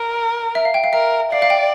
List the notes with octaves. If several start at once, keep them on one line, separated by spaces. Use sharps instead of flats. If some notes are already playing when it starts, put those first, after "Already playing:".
Already playing: A#4
E5
F5
G5
F5
A#4 E5
D5 F5
F5
G5